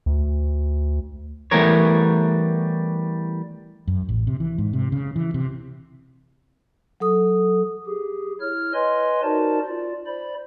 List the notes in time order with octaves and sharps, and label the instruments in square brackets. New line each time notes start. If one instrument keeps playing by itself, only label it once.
[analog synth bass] D2
[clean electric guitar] E3 G3 A3 B3 A#4 C#5
[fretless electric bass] F#2
A1
C3
E3
G#2
C3
C#3
E3
C3
[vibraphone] F#3 A4 D#6
[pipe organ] G4 G#4
E4 C#5 F6
B4 C#5 D#5 G#5 C6
D#4 F#4 A#4 C5 D5 A5
F4 D5
C5 D5 B5